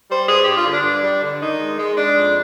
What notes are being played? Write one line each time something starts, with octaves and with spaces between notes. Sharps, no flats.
G3 C5
G2 G#4
G2 G4
F4
D3
D4
G2
G3
D3
D#3 D#4
G#3
G#3
G#3 D4
F2